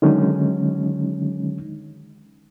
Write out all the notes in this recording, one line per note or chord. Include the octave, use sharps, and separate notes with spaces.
D3 D#3 F#3 G#3 C#4 D#4